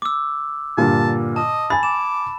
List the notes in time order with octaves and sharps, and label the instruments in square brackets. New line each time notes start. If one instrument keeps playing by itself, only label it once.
[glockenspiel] D6 E6
[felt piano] G2 A#2 D3 [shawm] A5
[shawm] D#5 [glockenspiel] A5
[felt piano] G#5 A6 [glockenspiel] B5
[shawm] D6 [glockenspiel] E7